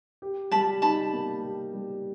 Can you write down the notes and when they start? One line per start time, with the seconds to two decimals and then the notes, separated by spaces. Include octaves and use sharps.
0.22 G4
0.51 G3 A5 B5
0.82 D#4 A5 B5
1.13 A#3
1.42 G4
1.73 G3